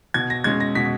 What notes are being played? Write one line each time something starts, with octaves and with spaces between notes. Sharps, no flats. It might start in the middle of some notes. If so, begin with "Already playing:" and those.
B2 G#6
A#6
G#3 C#4 G#6
A#6
B2 B6